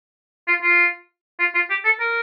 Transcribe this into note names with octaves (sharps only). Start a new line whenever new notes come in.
F4
F4
F4
F4
G4
A4
A#4